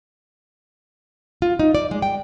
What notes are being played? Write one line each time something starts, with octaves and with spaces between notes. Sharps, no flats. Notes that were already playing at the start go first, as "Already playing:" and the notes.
F4
D#4
D5
G#3
G5